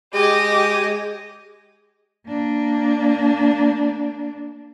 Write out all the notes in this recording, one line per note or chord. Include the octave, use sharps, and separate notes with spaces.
G#3 G4 D#5
A#3 D4